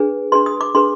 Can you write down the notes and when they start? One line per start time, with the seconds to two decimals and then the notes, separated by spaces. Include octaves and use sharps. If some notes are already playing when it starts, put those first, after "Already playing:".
Already playing: D4 G#4 B4
0.32 D4 G#4 B4 C6
0.46 D#6
0.61 D6
0.75 D4 G#4 B4 C6